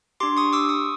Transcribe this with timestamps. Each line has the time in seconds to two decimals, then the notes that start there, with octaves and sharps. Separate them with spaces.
0.20 D4 G4 C6 D6
0.37 C#6 D#6
0.53 D6 E6
0.69 C#6 D#6